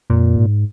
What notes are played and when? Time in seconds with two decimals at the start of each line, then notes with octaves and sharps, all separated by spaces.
0.10 F2 A#2
0.37 G#2